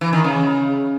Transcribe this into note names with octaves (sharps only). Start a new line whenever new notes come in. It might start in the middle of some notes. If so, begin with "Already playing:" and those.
E3
D#3
C#3